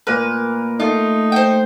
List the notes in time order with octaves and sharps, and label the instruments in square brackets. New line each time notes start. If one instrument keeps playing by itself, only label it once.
[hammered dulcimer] A#2 A#4 [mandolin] B4
[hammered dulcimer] A3 [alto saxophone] D#4 [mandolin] F4
[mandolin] C5 G5